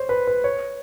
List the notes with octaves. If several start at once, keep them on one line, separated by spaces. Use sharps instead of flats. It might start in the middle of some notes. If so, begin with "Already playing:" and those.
Already playing: C5 C#5
B4
B4
C#5